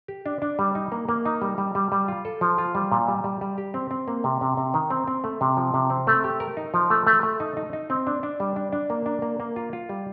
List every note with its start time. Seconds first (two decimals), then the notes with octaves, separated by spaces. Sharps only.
0.08 G4
0.26 D4
0.42 D4
0.59 G3
0.75 D#4
0.92 A#3
1.09 A#3
1.25 D#4
1.42 G3
1.58 G3
1.75 G3
1.92 G3
2.08 F4
2.25 A4
2.41 F3
2.58 F4
2.75 G3
2.92 A#2
3.08 G3
3.24 G3
3.41 G3
3.58 G4
3.74 C4
3.91 C4
4.08 A#3
4.24 C3
4.41 C3
4.57 C3
4.74 D#3
4.90 C4
5.08 C4
5.24 A3
5.41 C3
5.57 F3
5.74 C3
5.90 C4
6.07 A3
6.24 G4
6.40 A#4
6.57 D#4
6.74 F3
6.90 A3
7.07 A3
7.23 A3
7.40 D#4
7.57 D#4
7.73 D#4
7.90 C4
8.07 D4
8.23 D4
8.40 G3
8.56 D4
8.73 D4
8.90 A#3
9.06 D4
9.22 A#3
9.40 A#3
9.56 F4
9.73 F4
9.89 G3